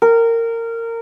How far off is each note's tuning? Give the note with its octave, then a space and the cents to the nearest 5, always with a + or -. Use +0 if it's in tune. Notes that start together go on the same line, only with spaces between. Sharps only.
A#4 -20